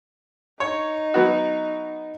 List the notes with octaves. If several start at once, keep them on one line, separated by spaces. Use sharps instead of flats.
D#4 C#5
F#3 B3 F#4